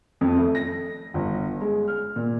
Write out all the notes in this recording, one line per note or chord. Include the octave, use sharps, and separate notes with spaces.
F2
A3
A#6
G1
G#3
F6
A#2